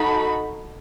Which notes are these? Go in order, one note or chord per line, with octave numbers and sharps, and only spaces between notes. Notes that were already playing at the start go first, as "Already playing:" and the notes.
Already playing: D#4 F#4 A4 B5